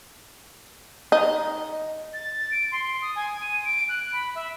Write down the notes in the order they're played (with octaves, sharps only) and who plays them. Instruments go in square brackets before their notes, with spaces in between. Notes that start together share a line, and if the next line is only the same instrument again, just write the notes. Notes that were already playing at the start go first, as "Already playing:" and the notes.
[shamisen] D#4
[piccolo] A6
D7
C6
D#6
G#5
D#7
D7
F#6
B5
E5